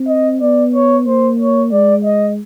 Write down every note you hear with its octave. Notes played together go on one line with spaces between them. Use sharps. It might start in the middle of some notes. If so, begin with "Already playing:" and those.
Already playing: C4
D#5
B3 D5
C#5
A#3 C5
C#5
G#3 D5
D#5